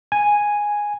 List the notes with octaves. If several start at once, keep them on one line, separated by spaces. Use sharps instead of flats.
G#5